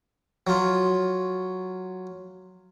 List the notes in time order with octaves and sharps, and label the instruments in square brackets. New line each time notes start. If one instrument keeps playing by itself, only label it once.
[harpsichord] F#3 F4